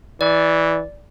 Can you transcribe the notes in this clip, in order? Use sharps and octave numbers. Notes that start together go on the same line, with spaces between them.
E3 D5